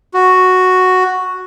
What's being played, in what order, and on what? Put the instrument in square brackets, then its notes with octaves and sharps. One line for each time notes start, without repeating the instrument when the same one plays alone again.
[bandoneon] F#4